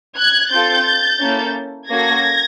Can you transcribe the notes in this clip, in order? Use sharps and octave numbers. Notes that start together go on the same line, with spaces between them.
F#6 G#6
C4 F4 A4 G6 A6
A#3 C#4 E4 A4
A#3 C#4 F#4 A4 G#6 A#6